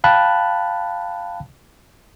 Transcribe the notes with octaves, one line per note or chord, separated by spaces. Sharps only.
F5 G5 A5 B5 F#6